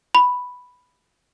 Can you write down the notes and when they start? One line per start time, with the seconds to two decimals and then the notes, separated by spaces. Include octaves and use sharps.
0.15 B5